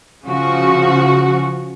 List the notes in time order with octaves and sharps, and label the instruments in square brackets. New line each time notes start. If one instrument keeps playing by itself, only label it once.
[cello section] C#3 F3 F#4